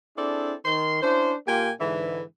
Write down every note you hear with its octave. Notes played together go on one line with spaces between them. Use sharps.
C4 D4 E4 G#4 A4 D5
D#3 C6
C#4 D4 E4 C5
A#2 A#3 F4 G4 G5 G#5
G#2 D3 E3